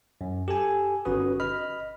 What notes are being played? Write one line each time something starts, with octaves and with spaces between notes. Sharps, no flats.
F#2
G4 A4 G#5
G1 C#4 F#4 B4 D#6
D#5 B5 F6